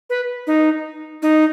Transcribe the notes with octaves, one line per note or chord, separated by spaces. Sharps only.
B4
D#4
D#4